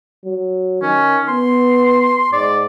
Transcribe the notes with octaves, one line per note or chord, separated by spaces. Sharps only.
F#3
D#3 C#4
B3 C6
G#2 D5